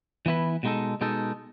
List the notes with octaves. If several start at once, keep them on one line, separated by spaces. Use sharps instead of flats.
E3 B3 E4 B4
B2 G#3 D#4 A4
B2 G#3 D#4 A4